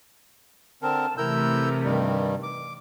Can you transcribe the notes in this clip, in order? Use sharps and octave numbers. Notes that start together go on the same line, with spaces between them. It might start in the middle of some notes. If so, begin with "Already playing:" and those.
D3 C4 A#4 A5
C3 E3 A3 E4 A#4 E6 G6
G2 D#3 G3
D6